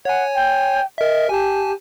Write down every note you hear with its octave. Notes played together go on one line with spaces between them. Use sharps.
C#5 F#5 G#5
G5
A#4 D#5 E5
G4 G#5 A5